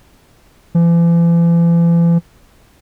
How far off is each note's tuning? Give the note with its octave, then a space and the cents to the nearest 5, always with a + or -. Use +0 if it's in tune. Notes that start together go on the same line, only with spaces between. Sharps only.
E3 +45